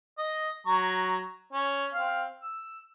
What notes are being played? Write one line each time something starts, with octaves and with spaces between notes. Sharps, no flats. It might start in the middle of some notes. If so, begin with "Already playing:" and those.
D#5
F#3 A#5 C#6
C#4
C4 F5
E6